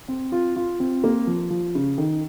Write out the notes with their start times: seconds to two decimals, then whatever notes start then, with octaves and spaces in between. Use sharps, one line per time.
0.08 C4
0.32 F4
0.56 F4
0.80 C4
1.04 A#3
1.27 F3
1.50 F3
1.75 C#3
1.98 D#3